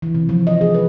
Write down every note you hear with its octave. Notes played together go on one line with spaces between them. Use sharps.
E3
C3
F3
D#5
G#4
B4